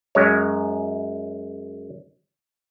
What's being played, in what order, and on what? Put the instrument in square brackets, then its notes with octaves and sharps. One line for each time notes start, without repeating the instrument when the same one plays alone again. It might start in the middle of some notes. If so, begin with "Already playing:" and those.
[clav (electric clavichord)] F#2 G#3 C#5